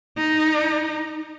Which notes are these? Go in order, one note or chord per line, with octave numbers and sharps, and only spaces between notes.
D#4